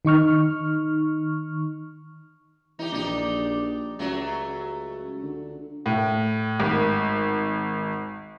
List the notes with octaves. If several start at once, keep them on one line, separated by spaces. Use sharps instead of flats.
D#3 D#4 C#6 F6
E3 D#4 G4
A#1 D4 D#4 G4
C#2 F#3 A3
D3
A2
G#1